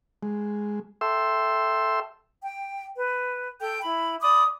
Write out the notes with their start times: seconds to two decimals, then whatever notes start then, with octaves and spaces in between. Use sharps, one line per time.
0.23 G#3
1.01 A4 E5 G5 C6 E6
2.42 G5
2.95 B4
3.60 A4 G5 G6
3.82 E4 B5
4.22 D5 B5 D6 D#6